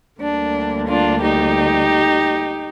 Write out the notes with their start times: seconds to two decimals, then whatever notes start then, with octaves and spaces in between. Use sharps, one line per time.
0.20 D2 D3 G3 A#3 D4
0.87 D4 F4
1.21 D#4 G4